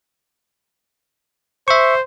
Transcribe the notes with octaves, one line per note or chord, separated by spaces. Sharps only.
C5 E5 C#6